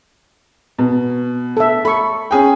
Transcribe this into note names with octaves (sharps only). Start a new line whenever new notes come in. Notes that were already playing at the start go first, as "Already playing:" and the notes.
B2
A4 E5
A4 B5 C#6
C#4 G#4 G5